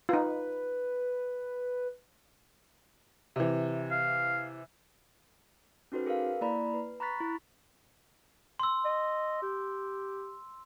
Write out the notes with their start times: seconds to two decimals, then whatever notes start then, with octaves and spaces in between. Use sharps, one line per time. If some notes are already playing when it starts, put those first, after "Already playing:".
0.09 D#4 F4 B4
3.36 C3 E3
3.91 F5
5.92 C#4 D#4 F#4 A4 B4 C5
6.06 G#4 A#4 B4 F5
6.41 A#3 E4 D5 A#5 B5
6.74 B4
7.00 A#5 B5 C#6 F#6 A6 B6
7.20 E4
8.60 C6 E6
8.85 D#5
9.42 G4